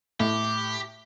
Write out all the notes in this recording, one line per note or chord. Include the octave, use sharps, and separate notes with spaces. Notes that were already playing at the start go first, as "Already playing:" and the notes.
A2 G4